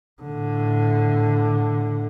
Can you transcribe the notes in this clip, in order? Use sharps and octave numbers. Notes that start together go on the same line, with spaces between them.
A2 D3